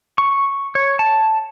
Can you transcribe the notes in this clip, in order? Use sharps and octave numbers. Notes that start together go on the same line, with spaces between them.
C#6
C#5
A5